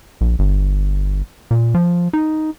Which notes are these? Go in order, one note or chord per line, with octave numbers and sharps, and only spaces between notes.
A#1
G1
A#2
F3
D#4